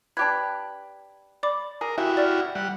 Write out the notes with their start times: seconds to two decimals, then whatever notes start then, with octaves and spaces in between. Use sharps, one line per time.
0.17 D4 G4 B4 G#6
1.43 D5 B5 D6
1.81 G#4 A#4
1.98 E4 F#4 G4 E5
2.17 D5 F6
2.55 G3 F#5